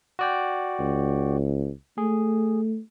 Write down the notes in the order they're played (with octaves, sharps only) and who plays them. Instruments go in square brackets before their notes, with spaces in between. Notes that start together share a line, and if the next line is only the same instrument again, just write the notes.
[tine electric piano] F#4 D5 G5
[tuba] C#2
[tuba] A3 [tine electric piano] G#4